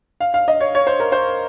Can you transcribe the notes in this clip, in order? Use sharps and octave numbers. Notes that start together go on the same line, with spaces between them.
F5
F5
D#5
C#5
C#5
C5
A#4
C5